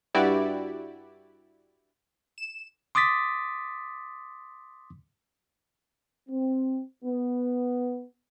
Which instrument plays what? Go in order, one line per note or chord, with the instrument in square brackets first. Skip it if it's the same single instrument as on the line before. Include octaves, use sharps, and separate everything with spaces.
[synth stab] G2 E4 F#4 G4 D5
E7
[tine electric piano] C6 D6 D#6 A6 B6
[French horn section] C4
B3